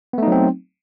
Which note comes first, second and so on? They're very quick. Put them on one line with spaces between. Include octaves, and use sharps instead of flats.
B3 A3 D#4 F#3 C4